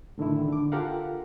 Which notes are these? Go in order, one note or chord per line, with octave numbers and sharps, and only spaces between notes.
A2 D3 D#3 E4
D3 D6
F4 G4 A4 A#4 F5 F#5